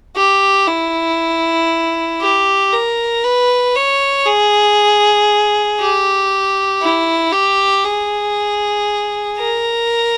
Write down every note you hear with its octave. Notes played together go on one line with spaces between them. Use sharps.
G4
E4
G4
A#4
B4
C#5
G#4
G4
E4
G4
G#4
A#4